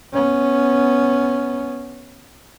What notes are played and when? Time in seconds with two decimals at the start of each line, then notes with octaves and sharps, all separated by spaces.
0.14 B3 C#4